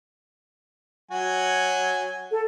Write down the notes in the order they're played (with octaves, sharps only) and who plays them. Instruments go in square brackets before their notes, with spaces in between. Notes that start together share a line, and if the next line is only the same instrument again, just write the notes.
[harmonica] F#3 F#4 G#5
[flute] A4